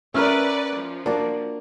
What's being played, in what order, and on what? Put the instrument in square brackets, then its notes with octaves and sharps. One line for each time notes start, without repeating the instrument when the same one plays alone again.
[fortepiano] C#4 F6 [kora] A#4 E5 [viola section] B4 D5 F#5
[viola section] F3
[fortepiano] A#3 [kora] D4 F#4 D5